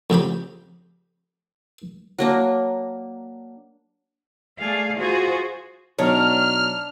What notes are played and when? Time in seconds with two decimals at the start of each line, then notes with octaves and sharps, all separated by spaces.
0.10 F2 C#3 G4 B5
2.18 F#3 A#3 D4
4.60 A3 G#4 D5 F5
4.99 F4 F#4 G#4 C5
5.99 B2 F#3 D4 D#4 C#5 F6